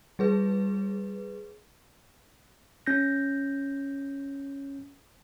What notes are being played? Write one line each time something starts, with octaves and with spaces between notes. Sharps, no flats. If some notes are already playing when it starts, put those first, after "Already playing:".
G3 G#4 B4
C#4 G6 A#6